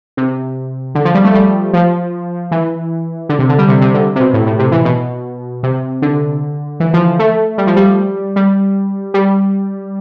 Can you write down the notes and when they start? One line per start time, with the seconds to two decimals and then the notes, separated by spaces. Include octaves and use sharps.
0.17 C3
0.95 D3
1.05 F3
1.14 G3
1.24 A3
1.34 G3
1.73 F3
2.51 E3
3.29 D3
3.39 C3
3.49 D3
3.58 G3
3.68 C3
3.81 C3
3.94 D3
4.16 C3
4.20 B2
4.34 A2
4.46 A2
4.59 C3
4.72 E3
4.85 B2
5.63 C3
6.02 D3
6.80 E3
6.93 F3
7.19 A3
7.58 G3
7.67 F3
7.76 G3
8.36 G3
9.14 G3